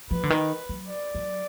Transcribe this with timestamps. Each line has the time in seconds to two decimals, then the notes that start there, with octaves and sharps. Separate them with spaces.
0.11 F3 B4
0.23 D3
0.30 D#3
0.69 F#3
0.88 D5
1.15 F#3